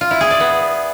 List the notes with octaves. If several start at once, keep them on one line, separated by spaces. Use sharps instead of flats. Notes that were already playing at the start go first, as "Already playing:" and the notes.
F4
E4
G#4
D5
B3